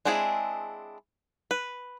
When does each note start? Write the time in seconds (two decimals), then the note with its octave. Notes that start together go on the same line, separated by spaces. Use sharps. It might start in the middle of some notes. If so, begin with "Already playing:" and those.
0.05 G#3 C4 D4 E4 G#4
1.51 B4